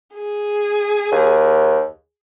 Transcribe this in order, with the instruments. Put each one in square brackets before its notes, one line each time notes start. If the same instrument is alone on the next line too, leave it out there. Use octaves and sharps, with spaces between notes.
[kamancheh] G#4
[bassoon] D#2